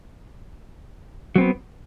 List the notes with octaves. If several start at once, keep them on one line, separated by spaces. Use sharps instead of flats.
F#3 B3 C4